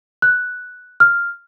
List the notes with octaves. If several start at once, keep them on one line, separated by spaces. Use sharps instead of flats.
F#6
F6